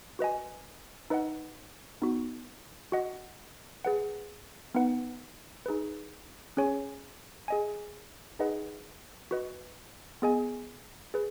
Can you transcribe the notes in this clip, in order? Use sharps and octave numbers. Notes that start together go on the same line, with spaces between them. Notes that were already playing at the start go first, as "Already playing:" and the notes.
F#4 B4 D#5 G#5
D#4 B4 D#5 F#5
B3 D#4 F#4
F#4 D#5 F#5
G#4 B4 F#5
B3 D#4 B4 F#5
D#4 G#4 B4
C#4 G#4 C#5 G#5
G#4 D#5 G#5
D#4 G#4 B4 D#5 F#5
F#4 B4 D#5
B3 G#4 D#5 G#5
G#4 B4